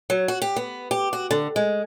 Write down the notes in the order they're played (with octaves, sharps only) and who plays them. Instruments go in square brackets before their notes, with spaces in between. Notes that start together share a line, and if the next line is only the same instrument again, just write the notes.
[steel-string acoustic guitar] F#3
F#4
G4
B3
G4
F#4
D3
G#3